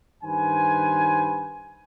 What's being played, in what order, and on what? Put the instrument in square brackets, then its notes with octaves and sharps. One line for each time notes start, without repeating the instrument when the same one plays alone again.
[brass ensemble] G2 D#3 B4 C5 G#5